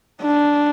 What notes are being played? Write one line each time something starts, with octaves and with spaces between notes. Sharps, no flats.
D4